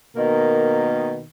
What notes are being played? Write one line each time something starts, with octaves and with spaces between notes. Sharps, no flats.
B2 D#3 A#3